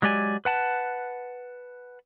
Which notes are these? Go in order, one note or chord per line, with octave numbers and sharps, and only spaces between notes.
F#3 G#3 G4 D5 G#5
B4 F#5 A5